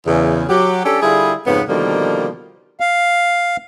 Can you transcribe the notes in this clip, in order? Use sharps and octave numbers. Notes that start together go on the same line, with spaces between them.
E2 C#3
F#3 G4
C#4 D4 G4 A4
D3 G3 E4 F4 G#4
F2 G#2 C#3 B3
B2 D3 D#3 F3 G3 A#3
F5